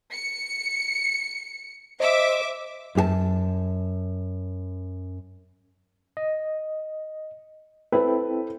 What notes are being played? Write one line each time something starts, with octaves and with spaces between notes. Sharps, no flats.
C#7
C5 D#5 E5 D6
F#2 G4 A5
D#5
C4 E4 A4 B4